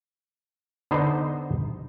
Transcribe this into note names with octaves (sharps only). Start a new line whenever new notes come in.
D3 B3 D#4 C5